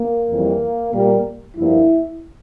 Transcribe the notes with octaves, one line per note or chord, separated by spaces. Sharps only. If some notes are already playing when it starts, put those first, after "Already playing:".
Already playing: A#3
F2 E3 G3
A#2 G3 A#3
G2 F3 A#3 E4